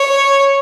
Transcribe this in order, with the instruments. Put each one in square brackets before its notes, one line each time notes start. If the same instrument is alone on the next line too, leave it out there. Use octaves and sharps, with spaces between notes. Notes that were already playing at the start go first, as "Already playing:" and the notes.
Already playing: [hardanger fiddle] C#5